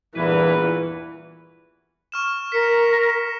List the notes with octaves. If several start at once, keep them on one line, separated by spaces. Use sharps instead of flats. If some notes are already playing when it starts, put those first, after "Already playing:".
E2 G2 A#2 E3 C#4 E4 B4
C#6 F6 E7
A#4 B6 C#7